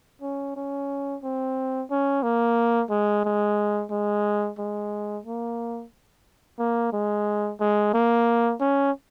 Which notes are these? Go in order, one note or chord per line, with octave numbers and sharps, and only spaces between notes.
C#4
C#4
C4
C#4
A#3
G#3
G#3
G#3
G#3
A#3
A#3
G#3
G#3
A#3
C#4